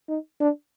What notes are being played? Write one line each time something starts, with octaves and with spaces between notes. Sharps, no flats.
D#4
D4